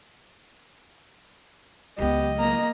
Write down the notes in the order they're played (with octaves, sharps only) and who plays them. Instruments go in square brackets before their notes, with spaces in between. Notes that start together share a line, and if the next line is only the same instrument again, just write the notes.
[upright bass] C#2 F#3 [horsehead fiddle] B3 G4 [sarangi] D#5
[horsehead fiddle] A#3 A#5